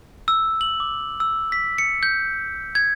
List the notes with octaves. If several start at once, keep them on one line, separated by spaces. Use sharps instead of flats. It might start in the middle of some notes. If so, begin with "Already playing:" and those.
E6
F#7
D6
E6
B6
C#7
G6
G#6